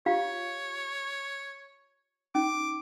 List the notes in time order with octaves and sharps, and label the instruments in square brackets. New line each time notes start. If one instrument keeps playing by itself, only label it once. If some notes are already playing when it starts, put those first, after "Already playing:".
[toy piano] F4 G4 F5 [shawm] C#5
[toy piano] C#4 D#4 [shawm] D6